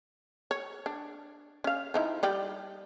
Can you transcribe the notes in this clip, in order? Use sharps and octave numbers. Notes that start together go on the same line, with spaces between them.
C#5
D4
C#4 F5
F3 D#4 E4
G3 D5 G5